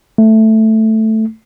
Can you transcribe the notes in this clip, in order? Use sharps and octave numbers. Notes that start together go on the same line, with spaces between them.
A3